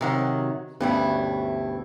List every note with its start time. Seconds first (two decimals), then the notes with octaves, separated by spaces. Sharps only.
0.01 C3 D#3 F#3
0.80 D2 G2 B2 G3 C#4 E4